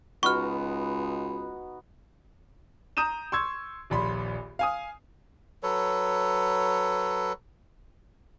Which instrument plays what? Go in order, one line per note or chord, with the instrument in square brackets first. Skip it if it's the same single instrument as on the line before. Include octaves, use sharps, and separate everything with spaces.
[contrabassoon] C#2 [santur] B3 D#4 F#4 [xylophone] C#6 F6
[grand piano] A#5 D#6 G6 D#7 E7
C6 C#6 E6 G#6
D#1 A#1 B5 C6
F5 G#5 D#6
[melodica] F#3 A4 B4 C#5